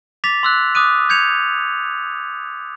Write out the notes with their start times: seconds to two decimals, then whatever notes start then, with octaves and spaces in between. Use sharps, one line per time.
0.24 D6 A6 B6 F7
0.43 C6 E6 F#6
0.75 D6 D#6 F#6 D#7
1.09 G6 G#6 C#7 F7